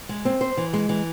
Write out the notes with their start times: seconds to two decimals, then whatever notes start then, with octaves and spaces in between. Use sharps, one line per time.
0.09 G#3
0.25 C4
0.41 C5
0.57 E3
0.73 G#3
0.89 E3